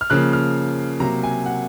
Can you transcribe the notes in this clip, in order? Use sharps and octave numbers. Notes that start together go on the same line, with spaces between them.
F6
C#3 F3 A#3 F#6
F6
C3 F#3 A#3 A#5
G#5
F#5